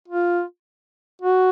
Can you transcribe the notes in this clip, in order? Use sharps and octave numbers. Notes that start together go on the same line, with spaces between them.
F4
F#4